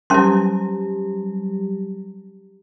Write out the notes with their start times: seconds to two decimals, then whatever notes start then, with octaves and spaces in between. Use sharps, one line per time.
0.10 F#3 G3 C#4 G4 C6